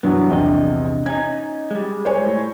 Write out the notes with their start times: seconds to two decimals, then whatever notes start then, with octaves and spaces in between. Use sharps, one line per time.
0.03 G2 E3 F#3 B3
0.29 A#1 E2 C3 D4 D#5
1.06 C#4 D#4 G#6
1.71 G3 G#3
2.05 C5 C#5 G#5
2.26 A2